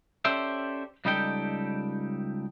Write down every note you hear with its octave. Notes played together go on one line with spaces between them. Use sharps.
C#4 G4 A4 C5 D5 E5
C#2 G3 D#4 G4 A4 G5